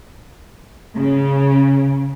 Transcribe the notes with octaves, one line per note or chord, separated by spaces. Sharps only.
C#3